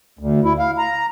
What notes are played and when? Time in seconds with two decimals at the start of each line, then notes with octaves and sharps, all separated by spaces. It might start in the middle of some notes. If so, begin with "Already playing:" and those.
0.19 D2
0.44 E4
0.58 F5
0.78 A#5